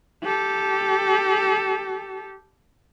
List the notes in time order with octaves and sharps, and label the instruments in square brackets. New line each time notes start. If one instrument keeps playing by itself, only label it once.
[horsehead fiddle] G4 A4